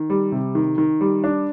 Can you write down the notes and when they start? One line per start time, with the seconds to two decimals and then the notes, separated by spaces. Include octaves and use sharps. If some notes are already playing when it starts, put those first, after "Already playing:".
Already playing: D#3
0.10 G3
0.32 C3
0.55 D#3
0.78 D#3
1.01 G3
1.24 D4